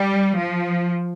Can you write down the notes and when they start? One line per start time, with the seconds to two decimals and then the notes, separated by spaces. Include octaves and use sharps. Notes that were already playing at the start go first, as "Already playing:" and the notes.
Already playing: G3
0.37 F3